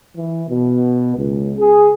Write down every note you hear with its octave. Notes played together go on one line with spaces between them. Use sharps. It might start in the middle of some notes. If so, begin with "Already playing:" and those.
E3
B2
C#2
G#4